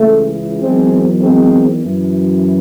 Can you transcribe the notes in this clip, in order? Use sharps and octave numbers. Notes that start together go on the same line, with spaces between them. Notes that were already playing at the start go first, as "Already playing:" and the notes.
Already playing: C#2 C#3 E3 A3
E2 D#3 F#3 G#3 C4
G#3 C4
F#2 E3